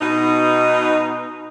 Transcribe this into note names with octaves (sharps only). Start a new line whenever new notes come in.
B2 D#4